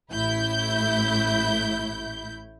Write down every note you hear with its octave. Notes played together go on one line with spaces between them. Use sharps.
A1 A2 E4 G6